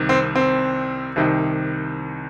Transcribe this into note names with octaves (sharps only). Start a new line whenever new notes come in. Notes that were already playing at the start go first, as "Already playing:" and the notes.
Already playing: C2 C3 D#3
C4
C4
C2 C3 D#3